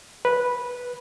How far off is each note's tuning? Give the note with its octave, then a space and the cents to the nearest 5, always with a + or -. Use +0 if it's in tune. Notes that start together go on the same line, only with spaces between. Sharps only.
B4 -10